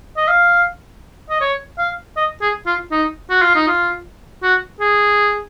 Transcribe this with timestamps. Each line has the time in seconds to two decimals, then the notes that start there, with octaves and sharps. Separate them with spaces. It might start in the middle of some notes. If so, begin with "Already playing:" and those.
0.17 D#5
0.28 F5
1.30 D#5
1.41 C#5
1.78 F5
2.17 D#5
2.42 G#4
2.66 F4
2.91 D#4
3.30 F#4
3.42 F4
3.55 D#4
3.68 F4
4.43 F#4
4.80 G#4